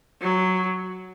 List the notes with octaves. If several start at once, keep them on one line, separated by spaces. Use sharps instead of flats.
F#3